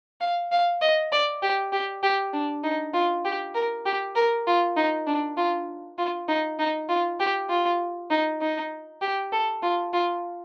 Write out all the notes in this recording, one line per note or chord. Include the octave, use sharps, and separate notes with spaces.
F5
F5
D#5
D5
G4
G4
G4
D4
D#4
F4
G4
A#4
G4
A#4
F4
D#4
D4
F4
F4
D#4
D#4
F4
G4
F4
D#4
D#4
G4
A4
F4
F4